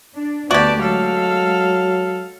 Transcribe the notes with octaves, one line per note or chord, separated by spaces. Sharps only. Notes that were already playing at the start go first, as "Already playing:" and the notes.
D4
D2 B3 F#4 G4 D5 A5
F#3 G#3 A4 F5